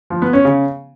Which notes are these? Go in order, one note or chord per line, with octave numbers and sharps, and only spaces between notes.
F3
B3
C#4
C#3